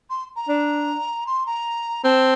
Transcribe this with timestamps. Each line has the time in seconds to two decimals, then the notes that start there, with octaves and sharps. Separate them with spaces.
0.10 C6
0.36 A#5
0.49 D4
1.27 C6
1.46 A#5
2.05 C4 A5